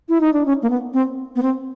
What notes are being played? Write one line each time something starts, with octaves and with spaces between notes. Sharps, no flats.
E4
D#4
D4
C#4
A#3
B3
C4
B3
C4